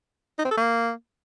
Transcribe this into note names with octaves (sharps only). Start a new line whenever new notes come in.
D#4
C4
A4
A#3